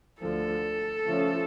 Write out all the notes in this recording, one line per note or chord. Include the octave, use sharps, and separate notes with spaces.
D2 D3 F3 A4
C#3 F3 A3 C#4